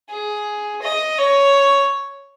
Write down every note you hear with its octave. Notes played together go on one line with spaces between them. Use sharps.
G#4
D#5
C#5